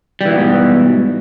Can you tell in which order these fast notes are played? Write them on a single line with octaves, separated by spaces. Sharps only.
G3 E3 G#2 B2